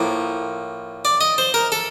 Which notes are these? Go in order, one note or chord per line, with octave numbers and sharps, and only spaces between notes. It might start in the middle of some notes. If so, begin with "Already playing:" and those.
Already playing: A2 F3 A#3
D5
D#5
C5
A#4
A4